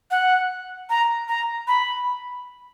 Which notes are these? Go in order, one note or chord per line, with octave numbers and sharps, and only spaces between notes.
F#5
A#5
A#5
B5